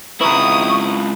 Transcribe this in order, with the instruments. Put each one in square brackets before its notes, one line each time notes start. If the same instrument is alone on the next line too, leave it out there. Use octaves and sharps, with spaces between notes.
[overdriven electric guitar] C#2 E4 [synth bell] B4 A#5 [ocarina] C#6 [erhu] D#6